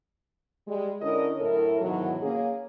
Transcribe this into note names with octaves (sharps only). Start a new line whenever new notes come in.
G3 G#3
D3 C#4 D4 E4 A#4 D#5
F#2 A2 E4 A4 A#4
G#2 B2 D#3 E3 F#3
A#3 C#4 G#4